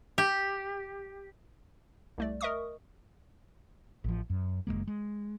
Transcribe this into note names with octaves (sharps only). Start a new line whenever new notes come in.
G4
C2 A3 D5
A#4 D#5 E5 C#6 D#6
A1 F3
F#2
F#1 F2 G#3 A#3
G#3